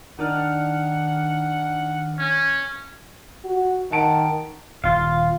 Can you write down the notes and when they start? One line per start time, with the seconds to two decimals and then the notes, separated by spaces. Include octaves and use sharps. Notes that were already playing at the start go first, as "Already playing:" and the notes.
0.19 D#3 D4 F#5 F6
2.19 C#4
3.45 F#4
3.91 D#3 F#5 A5 D7
4.84 D#1 F4 F5